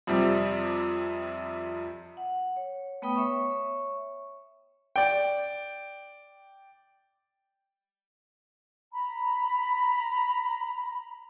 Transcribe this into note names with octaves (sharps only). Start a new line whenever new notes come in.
F2 C3 G3
F#5
C#5
A3 B3 B4 G5 B5 D#6
C#5 E5 C#6
D5 G5
A#5 B5